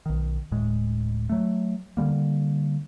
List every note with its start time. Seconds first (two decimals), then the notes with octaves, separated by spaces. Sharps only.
0.06 B1 D#3
0.52 D1 A2 G#3
1.29 F#3 A3
1.97 D3 D#3 G3 A#3